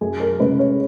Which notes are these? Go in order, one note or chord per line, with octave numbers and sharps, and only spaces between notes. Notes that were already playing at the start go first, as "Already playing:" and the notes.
F#2 G#4
A#4
C#3 G#3 C#4 B4
C#5